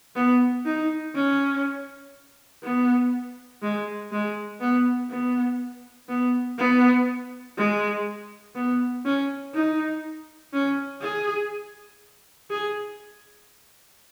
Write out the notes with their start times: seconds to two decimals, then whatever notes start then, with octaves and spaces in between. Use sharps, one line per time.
0.16 B3
0.65 D#4
1.15 C#4
2.63 B3
3.62 G#3
4.11 G#3
4.60 B3
5.10 B3
6.09 B3
6.58 B3
7.57 G#3
8.55 B3
9.05 C#4
9.54 D#4
10.53 C#4
11.01 G#4
12.50 G#4